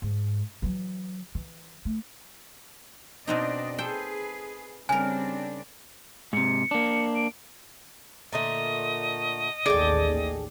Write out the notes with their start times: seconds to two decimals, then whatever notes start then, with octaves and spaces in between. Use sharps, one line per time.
0.02 G#2
0.62 E3 F#3
1.35 E3
1.85 A3
3.27 B2 C4 D4 D#4 D5 D#5
3.78 G#4 A4 B4 C5 G5
4.89 C#3 G3 C4 D4 A#4 G#5
6.33 G#2 C3 C#7
6.71 A#3 D4
7.15 D7
8.33 A#2 D3 A3 D#5
9.66 A1 D#2 G#4 A4 D5 G5